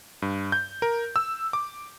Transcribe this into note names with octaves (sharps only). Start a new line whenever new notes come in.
G2
G6
A#4
E6
D6